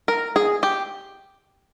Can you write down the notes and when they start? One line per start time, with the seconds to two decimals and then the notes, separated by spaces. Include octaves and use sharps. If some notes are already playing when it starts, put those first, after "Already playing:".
0.08 A#4
0.36 G#4
0.63 G4